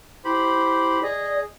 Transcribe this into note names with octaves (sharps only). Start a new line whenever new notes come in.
E4 G4 C5 B5
G#4 D5 D#5